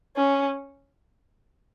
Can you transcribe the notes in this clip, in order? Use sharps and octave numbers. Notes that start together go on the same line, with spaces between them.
C#4